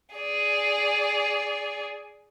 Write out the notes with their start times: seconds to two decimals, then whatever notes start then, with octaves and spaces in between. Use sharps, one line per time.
0.15 G#4 D5